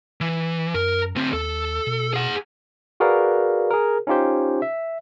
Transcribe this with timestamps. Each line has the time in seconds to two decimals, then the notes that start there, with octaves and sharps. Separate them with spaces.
0.21 E3
0.74 F#2 A#4
1.16 D2 C4
1.33 D#2 A4
1.87 B2
2.14 G#4 F#5
3.00 F#4 G#4 A#4 B4 D5 F5
3.71 G#4 A#4
4.07 C#4 D#4 F4 G4 C5
4.62 E5